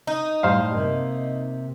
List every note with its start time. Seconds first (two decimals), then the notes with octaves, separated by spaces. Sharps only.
0.07 D#4
0.43 A2 G3 C5 F5
0.74 C3 A#3